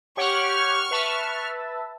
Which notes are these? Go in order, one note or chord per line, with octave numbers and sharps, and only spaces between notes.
G4 C#5 F#5 C#6 F6
B4 E5 A5